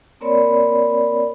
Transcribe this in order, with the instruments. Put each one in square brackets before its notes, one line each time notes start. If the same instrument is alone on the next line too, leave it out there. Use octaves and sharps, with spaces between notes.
[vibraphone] A#3 C4 A#4 C#5 D5 B5